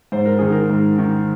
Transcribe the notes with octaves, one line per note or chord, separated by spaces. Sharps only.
G#2 C5
A#4
D#3 G#4
A#4
G#2
D#3